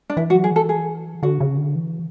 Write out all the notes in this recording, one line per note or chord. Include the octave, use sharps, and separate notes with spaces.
D4
E3 E4
F#4
F#3
G#4
E3 A4
G#4
D3 F#4
C#3
D3
E3